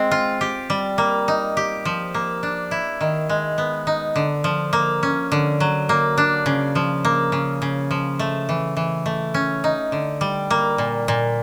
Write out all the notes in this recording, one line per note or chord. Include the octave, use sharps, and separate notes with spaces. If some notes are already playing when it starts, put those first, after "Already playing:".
Already playing: G#3 C4
F4
G4
G3
A#3
D#4
G4
F3
A#3
D4
E4
D#3
G#3
B3
D#4
D3
F3
A#3
C#4
D3
F#3
A#3
D4
C#3
F3
A#3
C#3
C#3
F3
A3
E3
E3
A3
C#4
D#4
D3
G3
A#3
A#2
A#2